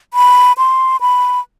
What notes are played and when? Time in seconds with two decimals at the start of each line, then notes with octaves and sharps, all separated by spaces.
0.14 B5
0.58 C6
1.01 B5